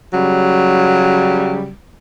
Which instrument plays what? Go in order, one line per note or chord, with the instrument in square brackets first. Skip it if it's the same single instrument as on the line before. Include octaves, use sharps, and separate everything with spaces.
[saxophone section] C#3 F#3 G3